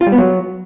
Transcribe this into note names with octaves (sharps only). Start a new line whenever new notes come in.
F4
G3
B3
F#3